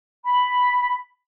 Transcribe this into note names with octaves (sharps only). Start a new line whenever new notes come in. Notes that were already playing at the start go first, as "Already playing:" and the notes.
B5